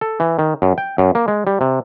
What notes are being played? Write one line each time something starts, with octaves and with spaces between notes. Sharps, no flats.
A4
E3
D#3
F#2
G5
F#2
A#3
G#3
G3
C3